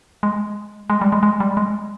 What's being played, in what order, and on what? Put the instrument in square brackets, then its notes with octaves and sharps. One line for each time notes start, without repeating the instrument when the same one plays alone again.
[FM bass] G#3
G#3
G3
G#3
G#3
G3
G#3